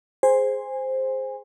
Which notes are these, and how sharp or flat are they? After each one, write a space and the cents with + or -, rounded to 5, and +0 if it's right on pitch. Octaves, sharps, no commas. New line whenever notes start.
G#4 +0 C5 +0 G#5 -25